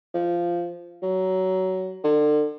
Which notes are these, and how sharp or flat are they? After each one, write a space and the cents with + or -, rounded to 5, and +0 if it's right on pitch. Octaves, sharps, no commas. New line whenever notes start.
F3 -10
F#3 +20
D3 +35